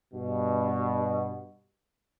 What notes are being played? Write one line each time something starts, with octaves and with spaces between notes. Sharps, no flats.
G2 B2